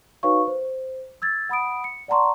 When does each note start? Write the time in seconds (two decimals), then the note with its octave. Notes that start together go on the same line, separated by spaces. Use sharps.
0.23 D#4 F#4 B4 C#5 F5 C#6
0.47 C5
1.22 E6 G#6 A6
1.49 F#5 B5 D#6 D7
1.84 C#7
2.08 D5 F#5 A5 A#5 C6 C#6